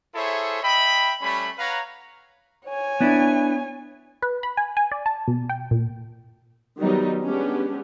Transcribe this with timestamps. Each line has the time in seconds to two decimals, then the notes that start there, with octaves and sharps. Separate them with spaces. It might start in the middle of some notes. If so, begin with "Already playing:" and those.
0.15 E4 G#4 A4 C5 C#5 E5
0.63 D#5 E5 G5 B5
1.22 G3 A3 C#4 B5
1.58 B4 C#5 F5 F#5 A#5
2.66 C#5 G#5
3.00 B3 D4 E4
4.22 B4
4.43 B5
4.57 G#5
4.77 G#5
4.92 D5
5.06 A5
5.28 B2
5.49 G5
5.71 A#2
6.78 D#3 F#3 G3 B3 D#4
7.24 G#3 B3 C#4 D4 G4